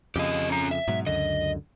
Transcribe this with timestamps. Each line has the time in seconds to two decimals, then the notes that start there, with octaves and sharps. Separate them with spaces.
0.16 F2 C#3 G4 D#5
0.50 C#4 A#5
0.71 E5
0.88 G#2 B2 F#3
1.07 C#2 F#2 D3 D#5